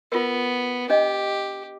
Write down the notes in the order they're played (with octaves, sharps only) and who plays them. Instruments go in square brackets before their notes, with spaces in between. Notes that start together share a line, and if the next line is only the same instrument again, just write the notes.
[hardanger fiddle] B3 [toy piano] F4 A#4
[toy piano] D4 D#5 [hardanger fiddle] G4